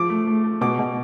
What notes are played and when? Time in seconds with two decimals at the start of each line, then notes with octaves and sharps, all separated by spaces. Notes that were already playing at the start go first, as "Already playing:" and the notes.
Already playing: F3 D6
0.09 A3
0.27 A3
0.44 A3
0.61 B2 D6
0.79 B2